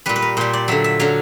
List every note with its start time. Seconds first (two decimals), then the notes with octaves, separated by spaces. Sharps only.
0.06 A#2 G3 B4
0.16 B4
0.22 A#4
0.37 A#2 G3 C5
0.53 D5
0.68 D3 F#3 E5
0.84 E5
1.00 D3 F#3 F5